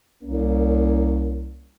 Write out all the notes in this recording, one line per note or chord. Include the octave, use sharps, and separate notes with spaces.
C2 A#3 C#4